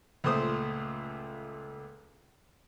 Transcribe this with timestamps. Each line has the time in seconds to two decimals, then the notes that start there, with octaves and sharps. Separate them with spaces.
0.24 C#2 A#2 A3 C5 D#6